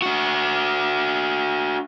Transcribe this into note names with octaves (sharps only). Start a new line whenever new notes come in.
D4 F#4